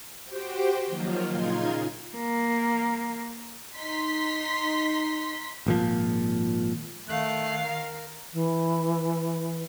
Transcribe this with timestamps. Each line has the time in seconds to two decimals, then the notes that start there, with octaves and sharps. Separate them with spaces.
0.24 F#4 G4 C5 G5
0.86 D#3 F3 F#3 A#3 F4
1.28 A#2 C#3 D#4 F4 C6 G#6
2.15 A#3
3.77 D#4 C6 B6
5.66 G#1 A#2 F3
7.08 D#3 A3 F5 F#6
7.64 A#4
8.33 E3